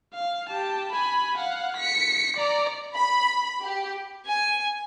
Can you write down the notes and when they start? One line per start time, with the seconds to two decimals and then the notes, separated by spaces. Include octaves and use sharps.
0.14 F5
0.50 G4 A5
0.92 G#5 B5
1.37 F5 F#5
1.77 B6 C#7
2.37 D5 A#5
2.94 B5
3.62 G4
4.26 G#5